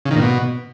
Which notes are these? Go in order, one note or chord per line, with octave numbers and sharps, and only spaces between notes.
C#3
D#3
A#2
B2